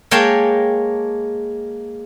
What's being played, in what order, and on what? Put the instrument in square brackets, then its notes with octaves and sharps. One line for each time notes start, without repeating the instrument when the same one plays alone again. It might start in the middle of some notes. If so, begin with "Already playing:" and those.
[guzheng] G#3 A#3 C#5 G5 A5